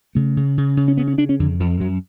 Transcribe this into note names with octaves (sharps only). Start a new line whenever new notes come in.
C#3 A3
C#3
C#3
C#3
C#4
C#3 B3
C#4
C#3 D4
C#4
F2 D3
F2 F3
F#2 F#3